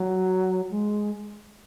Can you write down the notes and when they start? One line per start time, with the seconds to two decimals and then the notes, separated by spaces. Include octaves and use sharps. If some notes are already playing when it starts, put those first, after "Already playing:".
Already playing: F#3
0.70 G#3